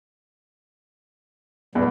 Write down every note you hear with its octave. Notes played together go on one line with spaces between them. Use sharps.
E2 A#2 G3 B3